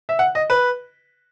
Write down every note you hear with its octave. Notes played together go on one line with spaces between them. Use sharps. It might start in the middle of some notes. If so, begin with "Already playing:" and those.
E5
F#5
D#5
B4